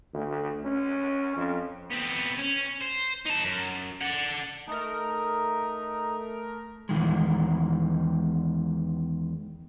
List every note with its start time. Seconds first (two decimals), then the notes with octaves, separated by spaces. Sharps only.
0.13 D2
0.64 C#4
1.36 F2
1.90 B3 C4
2.38 C#4
2.81 C5
3.25 D#4 A5
3.44 F#2
4.01 D5 F#5
4.68 A3 D#4 A#4
6.89 E2 G#2 D#3 G#3